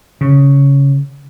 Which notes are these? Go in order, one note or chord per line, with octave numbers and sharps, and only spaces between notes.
C#3